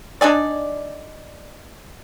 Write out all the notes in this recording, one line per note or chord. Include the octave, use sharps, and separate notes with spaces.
D4 D#4 G#4 D5